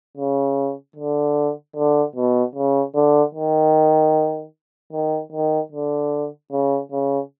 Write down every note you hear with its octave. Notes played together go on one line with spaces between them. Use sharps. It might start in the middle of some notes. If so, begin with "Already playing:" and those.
C#3
D3
D3
B2
C#3
D3
D#3
D#3
D#3
D3
C#3
C#3